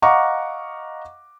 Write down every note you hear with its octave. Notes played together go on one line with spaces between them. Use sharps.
D#5 F5 F#5 A#5 C#6 D6